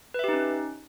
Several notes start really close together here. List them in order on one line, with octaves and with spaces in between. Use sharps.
B4 E5 G4 D#4 C#4